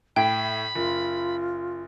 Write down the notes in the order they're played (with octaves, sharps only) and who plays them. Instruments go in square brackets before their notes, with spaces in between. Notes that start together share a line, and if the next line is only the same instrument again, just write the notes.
[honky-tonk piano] A2 [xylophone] G5 [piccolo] B5
[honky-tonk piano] F#1 [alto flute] F4